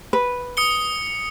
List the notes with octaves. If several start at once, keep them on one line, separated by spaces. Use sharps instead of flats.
B4
D#6 C#7 G7